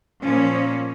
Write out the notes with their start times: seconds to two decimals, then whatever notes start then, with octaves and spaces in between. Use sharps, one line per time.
0.22 A#2 F3 A#3 C#4